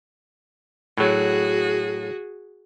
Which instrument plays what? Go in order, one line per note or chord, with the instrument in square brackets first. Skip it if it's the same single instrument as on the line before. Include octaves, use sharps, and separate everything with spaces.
[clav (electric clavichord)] A2 F#3 [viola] F#4 G#4